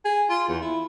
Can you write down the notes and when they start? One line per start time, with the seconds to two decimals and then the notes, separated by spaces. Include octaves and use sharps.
0.05 G#4
0.30 F4
0.48 E2
0.62 E4